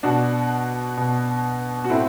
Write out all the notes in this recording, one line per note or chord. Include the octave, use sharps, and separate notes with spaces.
B2 D4 F#4
B2
F#4
A2 C4 E4